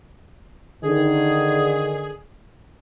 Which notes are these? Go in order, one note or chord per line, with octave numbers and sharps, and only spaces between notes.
D3 D#3 G#4